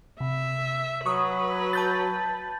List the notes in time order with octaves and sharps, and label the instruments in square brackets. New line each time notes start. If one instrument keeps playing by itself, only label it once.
[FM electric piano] C3 [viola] E5
[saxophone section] F#3 [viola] B4 [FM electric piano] C#6 D#6
[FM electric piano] A5 G6 A6